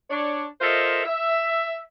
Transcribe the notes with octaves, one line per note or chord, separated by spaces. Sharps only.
D4 C#5
F4 A4 A#4 C5 D#5 E5
E5